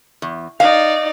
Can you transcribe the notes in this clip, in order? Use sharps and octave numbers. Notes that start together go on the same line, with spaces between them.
E2
D#4 D5 F5